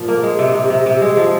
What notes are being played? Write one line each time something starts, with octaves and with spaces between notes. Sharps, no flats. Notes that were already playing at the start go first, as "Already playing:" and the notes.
Already playing: A#2 F3
A#3
G#3
C3
C3
C3
C3
G#3
F3